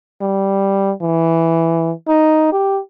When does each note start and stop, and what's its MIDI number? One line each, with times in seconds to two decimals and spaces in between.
0.21 0.92 55
1.02 1.91 52
2.08 2.50 63
2.52 2.80 67